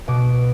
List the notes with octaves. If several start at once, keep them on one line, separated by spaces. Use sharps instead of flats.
B2 D6